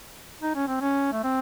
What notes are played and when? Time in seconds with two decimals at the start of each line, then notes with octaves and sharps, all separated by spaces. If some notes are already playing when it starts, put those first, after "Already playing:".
0.41 D#4
0.55 C#4
0.67 C4
0.81 C#4
1.12 A3
1.23 C4